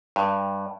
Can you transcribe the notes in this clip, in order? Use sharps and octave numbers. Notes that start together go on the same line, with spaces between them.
G2